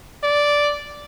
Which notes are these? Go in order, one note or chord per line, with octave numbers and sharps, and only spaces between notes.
D5